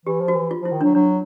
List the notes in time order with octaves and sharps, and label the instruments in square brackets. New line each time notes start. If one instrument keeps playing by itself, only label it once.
[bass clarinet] E3 [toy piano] G4
[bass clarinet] F3
[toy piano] F#4
[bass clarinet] E3
[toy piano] F4
[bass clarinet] F3 [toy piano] E4
[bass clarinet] D#3
[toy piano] D4
[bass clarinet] F#3
[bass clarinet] F#3 [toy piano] D4